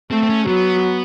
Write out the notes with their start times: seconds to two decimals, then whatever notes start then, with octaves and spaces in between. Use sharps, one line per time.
0.11 A3 C4
0.23 C4
0.29 C#4
0.48 F#3 B3